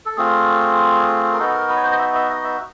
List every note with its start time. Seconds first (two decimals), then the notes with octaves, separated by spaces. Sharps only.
0.06 A4
0.17 A3 C4 F4 G#4
1.33 A#4
1.38 B3 D#4 F#4 A4
1.54 A#4
1.69 B4
1.77 C#5
1.83 C5
1.92 D#5
1.98 E5
2.14 E5
2.29 D#5
2.44 E5